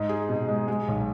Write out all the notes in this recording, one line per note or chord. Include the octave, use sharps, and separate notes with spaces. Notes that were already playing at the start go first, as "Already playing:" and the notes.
Already playing: G#2 D#4
G#4
B2
G#3
G#3
B1